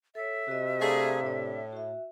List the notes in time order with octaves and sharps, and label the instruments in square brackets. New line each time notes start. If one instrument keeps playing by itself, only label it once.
[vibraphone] A4 C#5 [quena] E5
[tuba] C3 [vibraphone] F#4 D#5
[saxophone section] A3 D4 G#4 [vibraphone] F5 A#5
[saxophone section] A2 [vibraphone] D4 D5
[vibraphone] F#4 E5